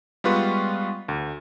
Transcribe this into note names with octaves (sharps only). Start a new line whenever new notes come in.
G3 G#3 B3 F4 B4 C#6
D2